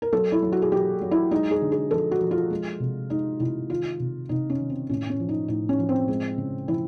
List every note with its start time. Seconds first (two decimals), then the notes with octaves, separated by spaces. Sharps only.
0.02 A#4
0.13 F#3 A4
0.32 E4
0.42 F#3
0.52 F#4
0.62 G#4
0.72 F#3 G4
1.01 F#3
1.11 E4
1.31 G#3 D#4
1.51 G#4
1.62 D3
1.72 G#4
1.91 F3 A4
2.11 F#4
2.21 F3
2.31 F4
2.50 G#3
2.80 C3
3.10 G#3 D#4
3.40 C3 E4
3.70 D#3 F4
4.00 C3
4.29 C3 D#4
4.50 C#4
4.59 D#3
4.70 C4
4.89 A2 C#4
5.10 C#4
5.20 F3
5.29 D#4
5.48 A2 D#4
5.69 C#4
5.79 F3
5.89 C4
6.08 G#3
6.38 C#3
6.68 F3 E4